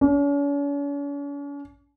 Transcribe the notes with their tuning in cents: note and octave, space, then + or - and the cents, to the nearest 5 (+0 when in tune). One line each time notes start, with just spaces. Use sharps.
C#4 +45